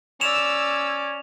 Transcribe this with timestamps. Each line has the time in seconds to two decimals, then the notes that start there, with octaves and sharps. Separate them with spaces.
0.21 C#4 D5 E6 E7 F7